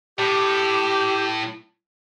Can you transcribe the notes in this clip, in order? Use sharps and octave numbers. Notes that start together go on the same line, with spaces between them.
A2 G4